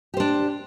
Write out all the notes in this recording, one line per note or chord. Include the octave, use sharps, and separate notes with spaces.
D4 G4 C5